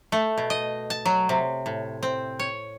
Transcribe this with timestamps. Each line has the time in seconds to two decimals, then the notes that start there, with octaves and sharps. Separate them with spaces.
0.12 A3
0.38 B2
0.50 D#5
0.90 A5
1.05 F#3
1.29 C3
1.66 A2
2.03 C4
2.39 C#5